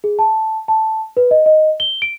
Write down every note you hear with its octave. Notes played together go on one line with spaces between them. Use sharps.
G#4
A5
A5
B4
D#5
D#5
G7
D7